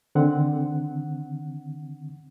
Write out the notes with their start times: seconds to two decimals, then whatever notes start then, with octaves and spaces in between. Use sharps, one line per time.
0.15 D3 D#3 C4 F#5